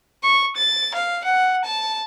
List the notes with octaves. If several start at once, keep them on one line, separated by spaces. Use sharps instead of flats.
C#6
A6
F5
F#5
A5